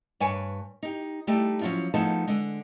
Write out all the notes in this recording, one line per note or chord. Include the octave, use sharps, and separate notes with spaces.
G2 D4 B4 C#5 G#5
D#4 G4
G3 A3 D#4 E4 G4
F3 F#3 C#4 E4 F4
F3 A3 B3 D#4 G#4 A5
D3 G#3